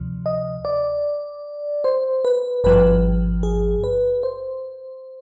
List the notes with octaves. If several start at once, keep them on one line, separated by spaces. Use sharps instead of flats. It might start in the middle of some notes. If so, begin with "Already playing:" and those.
Already playing: D2 C3 F3
D#5
D5
C5
B4
G#1 G2 F3 B4
G#4
B4
C5